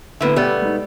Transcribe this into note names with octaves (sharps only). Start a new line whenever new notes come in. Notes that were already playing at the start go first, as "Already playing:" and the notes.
A2 D3 B3 B4 E5
B2 G3 A3 B3 G4
G#3 D#4